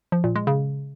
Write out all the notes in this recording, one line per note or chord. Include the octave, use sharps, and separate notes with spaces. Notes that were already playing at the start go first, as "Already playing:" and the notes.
F3
A#2
G#3
C#3